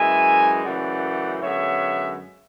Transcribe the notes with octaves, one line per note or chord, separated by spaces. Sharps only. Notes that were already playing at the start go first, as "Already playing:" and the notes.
Already playing: F#2 E3 G#3 E5 G#5
F#2 C#3 E3 A3 D5 F#5
F#2 D3 G#3 B3 C#5 E5